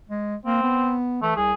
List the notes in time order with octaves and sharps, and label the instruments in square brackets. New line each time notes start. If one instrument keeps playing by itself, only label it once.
[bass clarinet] G#3
[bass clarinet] A#3 [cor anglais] C4
[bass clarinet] B3
[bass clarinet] E3 [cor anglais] A3
[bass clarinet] C2 [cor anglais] G#4